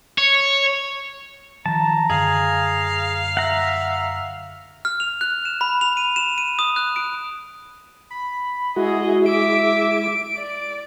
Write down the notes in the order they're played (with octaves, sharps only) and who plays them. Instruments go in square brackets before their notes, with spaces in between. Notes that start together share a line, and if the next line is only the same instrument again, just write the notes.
[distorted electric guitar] C#5
[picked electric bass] D#3 F3 [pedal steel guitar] A5 [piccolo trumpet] A#5
[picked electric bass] F#2 D3 [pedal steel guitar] G#4 [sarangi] F5
[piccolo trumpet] E5 [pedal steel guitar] F#5 A#5
[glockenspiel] F6
F7
F#6
E7
B5
F7
D#7
E7
D#7
D#6
F#6
D7
[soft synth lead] B5
[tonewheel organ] G#3 E4 [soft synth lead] F#4 [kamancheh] G#4 D#5
[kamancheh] E5 D6 [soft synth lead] D7
[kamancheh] D5